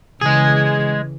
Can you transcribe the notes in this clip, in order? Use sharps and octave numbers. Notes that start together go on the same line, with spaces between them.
C#3 E3 G#3 G#4